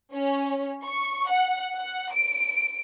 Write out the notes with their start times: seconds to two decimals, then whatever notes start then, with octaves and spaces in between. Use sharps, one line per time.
0.13 C#4
0.83 C#6
1.29 F#5
1.75 F#5
2.13 D7